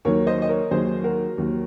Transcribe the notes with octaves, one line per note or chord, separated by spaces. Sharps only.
D#2 D#3 F#3 A#4 C#5
C5 D#5
D#5
A#4 C#5
D#2 D#3 F#3 G#4 C5
F#4 A#4
D#2 D#3 F#3